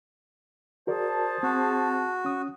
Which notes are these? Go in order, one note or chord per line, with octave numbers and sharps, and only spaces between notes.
F#4 G#4 A#4 C5 D5 A5
C4 F#4
C#4 D#6